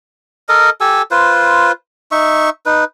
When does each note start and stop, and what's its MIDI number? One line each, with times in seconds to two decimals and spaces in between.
0.49 0.70 69
0.49 0.70 70
0.49 0.70 75
0.81 1.02 67
0.81 1.02 69
0.81 1.02 80
0.81 1.02 88
1.11 1.72 65
1.11 1.72 71
1.11 1.72 72
2.12 2.50 63
2.12 2.50 76
2.12 2.50 85
2.66 2.84 63
2.66 2.84 71